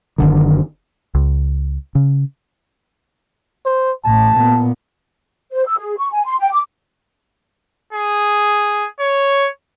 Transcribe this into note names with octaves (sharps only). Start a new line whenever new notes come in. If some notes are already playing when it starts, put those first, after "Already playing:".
F#1 C2 D3 D#3
C#2
C#3
C5
A1 A2 A5
A#2 B3
C5
E6
G#4
C#6
G#5
C6
G5
D6
G#4
C#5